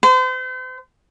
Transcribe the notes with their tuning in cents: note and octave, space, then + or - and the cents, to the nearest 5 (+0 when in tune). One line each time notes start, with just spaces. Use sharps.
C5 -40